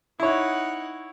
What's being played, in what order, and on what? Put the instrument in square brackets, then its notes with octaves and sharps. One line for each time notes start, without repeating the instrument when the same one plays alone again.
[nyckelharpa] D#4 F#5 [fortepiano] E4 C#5